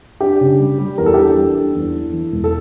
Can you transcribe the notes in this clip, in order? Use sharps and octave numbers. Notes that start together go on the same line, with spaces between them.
D4 G4
C#3
G3
G3
E2 A#4
A4
G4
D4 A4
G3
D4
E2
E3
E3
E1
A4